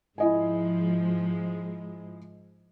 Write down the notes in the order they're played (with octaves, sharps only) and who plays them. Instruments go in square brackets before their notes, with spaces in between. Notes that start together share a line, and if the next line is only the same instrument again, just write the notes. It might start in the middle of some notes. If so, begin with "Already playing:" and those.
[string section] G#2 F3 G#3 [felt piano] E4 D#5 G#5